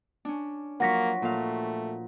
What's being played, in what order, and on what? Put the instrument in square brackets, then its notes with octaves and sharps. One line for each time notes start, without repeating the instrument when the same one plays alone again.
[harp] C#4 D4
[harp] F3 F#3 C#6 [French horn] A#3 [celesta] F#5 A#6 B6
[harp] A#2 F5 [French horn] A3